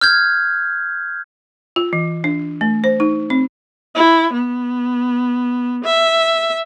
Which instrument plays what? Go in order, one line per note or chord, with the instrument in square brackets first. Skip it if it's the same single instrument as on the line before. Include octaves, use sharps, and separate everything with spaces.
[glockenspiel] F6 G6 G#6
[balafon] F4
E3
D4
A3
C5
D#4
C4
[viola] E4
B3
E5